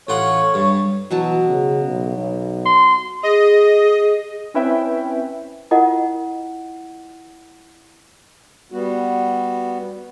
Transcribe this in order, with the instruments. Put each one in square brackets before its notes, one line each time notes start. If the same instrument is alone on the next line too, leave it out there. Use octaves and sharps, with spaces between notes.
[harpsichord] A1 F4 F#5 [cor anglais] C#5
[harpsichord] G2
[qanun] B2 F#3 A5 [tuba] E3
[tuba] C#3
B1
B1
[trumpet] C6
[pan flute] G#4 [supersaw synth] D#5
[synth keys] C4 C#4 E4 B4 E5 G5
[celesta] E4 F4 A#4 D#5 F#5
[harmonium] G3 B3 F#4